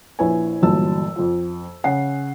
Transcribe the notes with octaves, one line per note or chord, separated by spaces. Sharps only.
A#1 E4 B4 C#5 G#5
G1 A#2 E3 F#3 A5 E6
F2 F3
C#3 C#4 F#5 C7